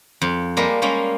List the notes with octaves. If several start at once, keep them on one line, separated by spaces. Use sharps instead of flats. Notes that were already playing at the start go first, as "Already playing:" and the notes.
F2
G3 G#3 A#3 A#4
G3 G#3 A#3 C#4